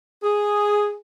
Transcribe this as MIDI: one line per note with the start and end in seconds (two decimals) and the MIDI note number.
0.23 0.93 68